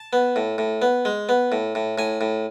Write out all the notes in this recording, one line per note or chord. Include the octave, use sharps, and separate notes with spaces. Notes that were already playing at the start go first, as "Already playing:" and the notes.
Already playing: A5
B3
A2
A2
B3
G#3
B3
A2
A2
A2 G#5
A2